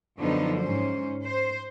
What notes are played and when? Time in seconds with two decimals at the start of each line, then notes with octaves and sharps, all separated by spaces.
0.19 F#2 D3 F3 B3 D#4
0.59 G#2 C#4 C5
1.25 C5